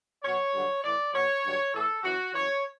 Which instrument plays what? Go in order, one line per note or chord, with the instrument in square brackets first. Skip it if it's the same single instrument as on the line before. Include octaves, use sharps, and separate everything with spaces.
[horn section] B2 F#3 C#5
G2 D3 F#3
A2 E3 D5
B2 F#3 C#5
G2 D3 F#3
A2 E3 A4
F#2 E3 F#4
F#2 E3 C#5